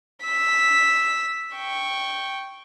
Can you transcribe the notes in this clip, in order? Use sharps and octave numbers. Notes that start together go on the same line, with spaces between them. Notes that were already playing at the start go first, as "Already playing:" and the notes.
E6 B6
G5 C#6